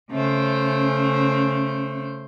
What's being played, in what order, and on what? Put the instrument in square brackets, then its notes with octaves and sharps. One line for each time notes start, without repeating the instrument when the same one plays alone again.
[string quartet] C#3 A3 C5 [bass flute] C#4